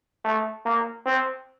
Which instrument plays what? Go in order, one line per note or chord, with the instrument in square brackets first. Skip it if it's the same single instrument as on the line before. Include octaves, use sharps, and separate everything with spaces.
[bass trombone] A3
A#3
C4